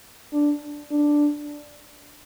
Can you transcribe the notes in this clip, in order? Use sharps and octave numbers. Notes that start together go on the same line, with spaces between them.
D4
D4